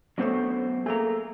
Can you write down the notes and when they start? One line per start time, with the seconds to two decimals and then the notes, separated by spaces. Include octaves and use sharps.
0.18 F#3 A3 B3 C#4 D4 C5
0.86 A3 A#3 G#4 A#5